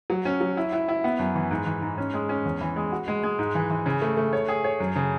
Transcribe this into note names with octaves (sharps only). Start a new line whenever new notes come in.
F#3
C#4
F#3
E4
E4
E4
B3
F#2
E3
G#2
E3
G#2
C#4
G#3
C#4
E2
E3
G#3
F#4
G#3
G#3
G#2
E3
E3
C#3
A3
A3
C#5
G#4
C#5
F#2
C#3